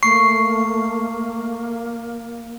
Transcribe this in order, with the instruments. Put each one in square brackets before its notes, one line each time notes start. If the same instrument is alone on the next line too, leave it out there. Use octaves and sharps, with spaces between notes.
[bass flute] A3 [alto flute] A#3 [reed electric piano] C#6 [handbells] C7